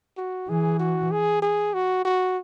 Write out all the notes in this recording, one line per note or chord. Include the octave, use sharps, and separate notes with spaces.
F#4
E3 G#4
F#4
G#4
G#4
F#4
F#4